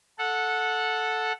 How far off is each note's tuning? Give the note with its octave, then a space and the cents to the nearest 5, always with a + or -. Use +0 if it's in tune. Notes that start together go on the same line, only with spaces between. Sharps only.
A4 -5 F#5 -15